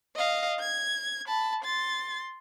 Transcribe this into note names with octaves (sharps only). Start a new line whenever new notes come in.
D#5 F5
G#6
A5 B5
C6 A6